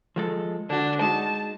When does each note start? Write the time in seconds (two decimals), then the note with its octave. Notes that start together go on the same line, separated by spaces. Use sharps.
0.16 F3 G#3 A4
0.70 D3 D4 F#4
1.01 G#3 D#4 F#4 A5